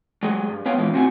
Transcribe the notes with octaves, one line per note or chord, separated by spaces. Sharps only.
F#3 G#3 G#4
G2
B3 C#5 F5 G5
A#2 D3 E3 F3 G#3 B3
C2 A2 C4 F#4 F#5 G#5